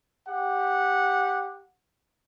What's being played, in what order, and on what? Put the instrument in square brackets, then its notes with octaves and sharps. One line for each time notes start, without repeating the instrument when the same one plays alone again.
[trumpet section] G4 F#5